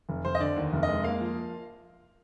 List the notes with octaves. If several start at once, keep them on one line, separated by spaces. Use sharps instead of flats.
F1
F1 C5
D#5
D3 D5
D#2
F1
D#5
G#3
A#3 F5
F3